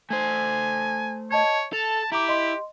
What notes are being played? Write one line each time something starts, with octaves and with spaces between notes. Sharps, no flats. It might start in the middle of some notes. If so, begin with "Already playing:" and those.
A3 C5 G#5
C#5 D#5 A5 G#6
A4 A5 F7
E4 G4 A#5 D6
D#5 C6